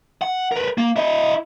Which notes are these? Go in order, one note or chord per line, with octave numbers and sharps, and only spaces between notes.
F#5
A#4 B4
A#3
E4 D#5